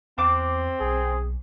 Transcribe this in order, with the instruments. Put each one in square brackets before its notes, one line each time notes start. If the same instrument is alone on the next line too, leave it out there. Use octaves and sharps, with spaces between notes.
[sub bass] E2 [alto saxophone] C4 [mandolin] C5 D6 F#6
[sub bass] B1 [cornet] G#4